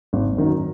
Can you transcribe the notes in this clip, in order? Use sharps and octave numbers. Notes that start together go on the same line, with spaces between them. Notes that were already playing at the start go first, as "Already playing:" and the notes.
G#1
F#2 D#3 F#3